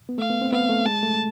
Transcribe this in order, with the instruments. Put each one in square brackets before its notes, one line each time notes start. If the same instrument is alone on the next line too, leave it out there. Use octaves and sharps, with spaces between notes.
[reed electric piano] B3
[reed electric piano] A3 [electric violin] F5
[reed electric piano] B3
C4
[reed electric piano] B3 [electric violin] F5
[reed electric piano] A3
[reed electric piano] G#3 [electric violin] A5
[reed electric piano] A3